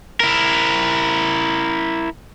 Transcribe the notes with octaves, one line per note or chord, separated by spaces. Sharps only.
E4 A#4